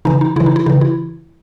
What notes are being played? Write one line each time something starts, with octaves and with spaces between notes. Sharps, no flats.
C#3 E3 D#4
D#4
C#3 E3 E4
D#4
E4
C#3 E3 D#4
E4